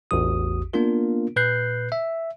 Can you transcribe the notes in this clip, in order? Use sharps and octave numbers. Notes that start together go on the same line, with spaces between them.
A1 E2 F#4 D#6
A#3 B3 D4 F4 A#4
A#2 B4 F#6 G6 C7
E5